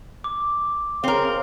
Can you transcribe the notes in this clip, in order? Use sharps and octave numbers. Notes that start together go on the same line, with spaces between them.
D6
C4 G#4 A#4 C#5 F5